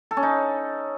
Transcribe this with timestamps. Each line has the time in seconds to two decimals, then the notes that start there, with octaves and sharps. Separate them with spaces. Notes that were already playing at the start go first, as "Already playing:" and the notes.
0.11 A4
0.17 C#4
0.23 D#4